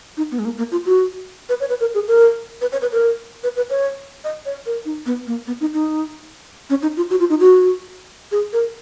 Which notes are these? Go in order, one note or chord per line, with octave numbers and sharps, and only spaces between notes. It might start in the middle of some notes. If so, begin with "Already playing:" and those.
D#4
B3
G#3
A#3
A#3
F4
F#4
B4
C#5
B4
A#4
G#4
A#4
B4
C#5
B4
A#4
B4
B4
C#5
D#5
C#5
A#4
D#4
B3
A#3
B3
D#4
D#4
C#4
D#4
F4
F#4
F4
D#4
F#4
G#4
A#4